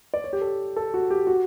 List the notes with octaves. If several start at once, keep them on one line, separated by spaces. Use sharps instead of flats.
D5
C#5
G4
A4
A4
F#4
G4
F#4